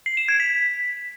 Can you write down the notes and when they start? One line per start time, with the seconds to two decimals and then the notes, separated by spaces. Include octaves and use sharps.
0.06 C7
0.17 E7
0.28 G#6
0.40 B6